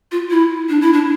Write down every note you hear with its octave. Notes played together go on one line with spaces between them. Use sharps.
F4
E4
D4
E4
D4